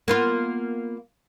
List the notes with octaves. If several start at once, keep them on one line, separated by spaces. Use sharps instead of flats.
A#3 B3 F4